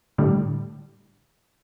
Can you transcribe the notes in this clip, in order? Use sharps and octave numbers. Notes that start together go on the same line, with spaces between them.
A2 D3 G3